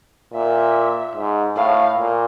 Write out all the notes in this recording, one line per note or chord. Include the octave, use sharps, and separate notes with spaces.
A#2 E5
G#2
A2 F5
A#2